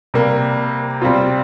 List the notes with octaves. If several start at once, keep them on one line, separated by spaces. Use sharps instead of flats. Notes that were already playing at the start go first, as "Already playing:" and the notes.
C3 G3 A#3
C3 G3 C4 F4